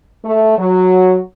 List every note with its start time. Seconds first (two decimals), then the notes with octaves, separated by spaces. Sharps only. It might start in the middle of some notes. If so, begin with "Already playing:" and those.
0.25 A3
0.59 F#3